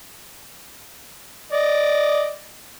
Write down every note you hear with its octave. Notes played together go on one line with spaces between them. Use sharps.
D5 D#5